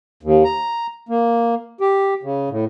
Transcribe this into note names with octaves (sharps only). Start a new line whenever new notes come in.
D#2
A#5
A#3
G4
C#3
A2